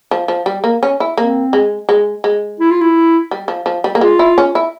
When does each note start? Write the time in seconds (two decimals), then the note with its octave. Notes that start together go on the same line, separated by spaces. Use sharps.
0.11 F3
0.28 F3
0.46 G3
0.64 A#3
0.83 C#4
1.00 E4
1.17 A#3 C4
1.53 G#3
1.89 G#3
2.24 G#3
2.60 E4
2.71 F4
2.81 E4
3.31 G3
3.48 F3
3.66 F3
3.84 G3
3.95 A#3
4.01 G#3 F4
4.19 E4
4.38 C#4
4.55 E4